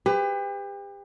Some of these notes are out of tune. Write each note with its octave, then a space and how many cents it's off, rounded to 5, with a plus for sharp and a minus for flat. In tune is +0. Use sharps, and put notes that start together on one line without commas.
G4 +35 B4 +35